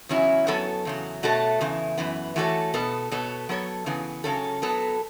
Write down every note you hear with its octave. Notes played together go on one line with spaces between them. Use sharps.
E2 C#3 F#3 C#4 E4
F#2 F#3 B3 A4 C#5
E2 C#3 F#3
B2 A3 F#4 A4 C#5
E2 C#3 E3
F#2 E3 B3
E3 A3 F#4 A4 C#5
B2 B3 A4
B2 B3 A4 C#5
F#3 B3 A4 C#5
C#3 E3 B3
C#3 F#3 C#4 A4
F#3 B3 A4